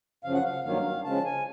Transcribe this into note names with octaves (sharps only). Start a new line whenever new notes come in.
F#2 C#3 F3 F5
F#5
F5
G2 D#3 F#3 A#3 F5
C#3 F3 G#3 C#4 A5
G#5